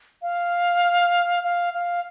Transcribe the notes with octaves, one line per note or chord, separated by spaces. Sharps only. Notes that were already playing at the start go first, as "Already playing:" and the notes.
F5
F5
F5